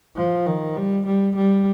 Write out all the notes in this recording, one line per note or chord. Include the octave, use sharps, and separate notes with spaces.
F3
D#3
G3
G3
G3